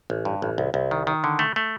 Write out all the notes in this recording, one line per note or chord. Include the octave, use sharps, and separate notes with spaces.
A1
G2
A1
C2
C2
D#3
D#3
D3
A3
A3